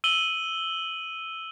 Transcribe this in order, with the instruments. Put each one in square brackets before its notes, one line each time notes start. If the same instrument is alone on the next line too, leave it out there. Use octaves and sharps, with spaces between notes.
[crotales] E6 D#7 F#7 G7